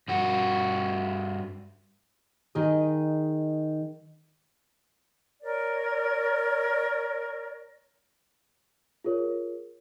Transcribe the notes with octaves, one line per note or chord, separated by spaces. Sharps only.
G2 F#4
D#3 G#4 D#5
A#4 C#5 D5
F4 G#4 A#4 C#5